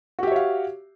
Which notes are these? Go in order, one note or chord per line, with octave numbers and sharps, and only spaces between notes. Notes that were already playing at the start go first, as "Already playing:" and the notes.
F#4 G4 C#5 E5 F5